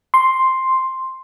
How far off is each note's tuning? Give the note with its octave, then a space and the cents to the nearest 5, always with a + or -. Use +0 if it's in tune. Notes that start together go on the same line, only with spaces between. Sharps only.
C6 +5